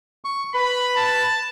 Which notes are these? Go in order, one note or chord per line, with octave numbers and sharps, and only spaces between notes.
C#6
B4 B5
A5